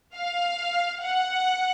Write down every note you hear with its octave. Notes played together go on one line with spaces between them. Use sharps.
F5
F#5